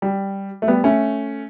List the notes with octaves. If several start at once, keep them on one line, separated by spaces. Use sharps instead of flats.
G3
A3
G3 B3
A3 C#4